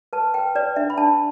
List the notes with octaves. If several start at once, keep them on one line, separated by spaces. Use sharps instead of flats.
B4 A5
B4 G5
B4 D5
D4 E5
B5
D4 A5